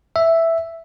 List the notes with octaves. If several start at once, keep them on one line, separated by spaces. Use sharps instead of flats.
E5